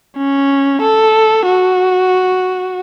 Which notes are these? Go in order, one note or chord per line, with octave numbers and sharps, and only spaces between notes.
C#4
A4
F#4